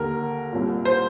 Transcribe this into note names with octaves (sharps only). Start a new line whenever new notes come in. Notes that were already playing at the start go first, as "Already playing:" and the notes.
Already playing: D#2 D3 A#4
C2 A#2
C5